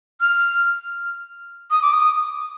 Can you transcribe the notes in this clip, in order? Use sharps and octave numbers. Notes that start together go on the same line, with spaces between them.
F6
D#6
D6
D#6